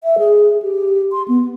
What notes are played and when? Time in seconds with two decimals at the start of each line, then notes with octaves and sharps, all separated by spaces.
0.03 E5
0.19 G#4
0.62 G4
1.12 C6
1.28 B3